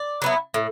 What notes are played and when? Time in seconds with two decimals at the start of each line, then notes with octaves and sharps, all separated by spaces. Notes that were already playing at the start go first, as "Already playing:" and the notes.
Already playing: D5
0.22 F#3 B3 E4
0.54 A2